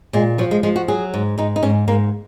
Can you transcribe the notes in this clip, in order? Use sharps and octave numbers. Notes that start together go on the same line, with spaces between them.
A#2 G#3
F3 F#3
G#3
F3 G#3
F#4
F#3 G#4
G#2
G#2 D#4
D#4
G#2 C#4
G#2 A#3